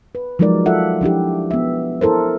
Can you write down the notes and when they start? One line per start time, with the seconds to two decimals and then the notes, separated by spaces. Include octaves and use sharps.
0.15 B4
0.39 F3 F#3 G#3 D#4 A#4 D5
0.66 F4 A4 E5 F#5
1.01 F3 D4 E4 G4
1.51 B3 E5
2.01 E4 A4 A#4 C5